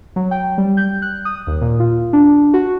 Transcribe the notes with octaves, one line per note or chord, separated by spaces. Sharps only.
F#3
G5
G3
G6
F#6
D#6
D#2
A#2
F4
D4
F#4